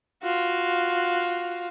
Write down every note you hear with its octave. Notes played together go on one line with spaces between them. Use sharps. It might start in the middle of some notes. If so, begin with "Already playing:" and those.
F4 F#4